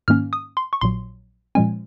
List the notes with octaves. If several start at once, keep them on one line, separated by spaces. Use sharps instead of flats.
G#2 D#3 A#3 C#4 F6
D#6
C6
C#6
A#1 A#2 F#3 C6
A#2 F3 G#3 C#4 G#5